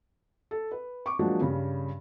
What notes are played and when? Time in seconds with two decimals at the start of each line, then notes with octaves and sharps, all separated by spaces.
0.51 A4
0.72 B4
1.06 C#6 D6
1.19 F3 F#3 G#3 A#3 D4 F#4
1.41 G2 C#3